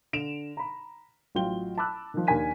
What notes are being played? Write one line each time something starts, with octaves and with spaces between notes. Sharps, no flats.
D3 D7 E7 F7
A#5 B5
A1 F#3 F4 G5 G7
A5 B5 D6 E6 F#6
D#3 F3
D#2 D4 A#4 G#5 B6 D#7